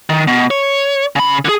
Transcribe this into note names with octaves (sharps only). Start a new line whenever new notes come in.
D#3
B2
C#5
C#3 B5
D3 G#4